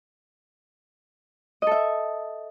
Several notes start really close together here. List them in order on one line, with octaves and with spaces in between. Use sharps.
D#5 A4 E5